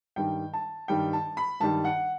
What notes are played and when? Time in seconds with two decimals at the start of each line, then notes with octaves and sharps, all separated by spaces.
0.16 G2 D#3 G3 G5
0.53 A5
0.88 G2 D#3 G3 G5
1.13 A5
1.37 B5
1.60 G2 D#3 G3 A5
1.85 F#5